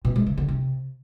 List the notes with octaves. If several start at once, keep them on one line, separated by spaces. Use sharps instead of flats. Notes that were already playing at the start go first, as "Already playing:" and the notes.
B2
G#3
C#3
D3
C3